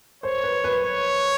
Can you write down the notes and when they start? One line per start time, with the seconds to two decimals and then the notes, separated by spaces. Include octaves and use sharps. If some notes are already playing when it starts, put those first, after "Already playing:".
0.23 C5 C#5
0.43 B4
0.64 B4
0.83 C#5